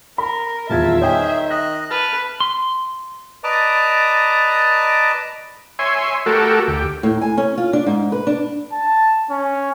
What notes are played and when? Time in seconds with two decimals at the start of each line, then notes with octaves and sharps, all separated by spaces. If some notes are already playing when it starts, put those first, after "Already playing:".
0.18 A#4 B5
0.70 D#1 E2 F4 A#4 E5 A5 G#6
1.01 D#3 G#4 C5 C#5 G5 G#5
1.50 D#5 F#6 A#6
1.90 B4 A5 F6
2.40 C6
3.44 B4 D5 D#5 A5 A#5 D6
5.79 C#5 E5 G#5 C6
6.26 A3 F#4 G4 A4 A#4
6.68 D2 G4
7.03 A2
7.21 G#5
7.37 C#4
7.58 F4
7.73 D4
7.86 G#2
8.12 B4
8.27 D4
8.73 A5
9.31 C#4